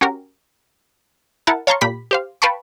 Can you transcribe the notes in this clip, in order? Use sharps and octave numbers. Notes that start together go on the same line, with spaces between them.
C#4 F#4 G4 A#4
E4 A#4 F#5 A5
C#5 F5 A5 A#5 C6 C#6
A#2 G4 B5 B6
G4 C5 F5
B4 F5 G5 A5 B5 C#6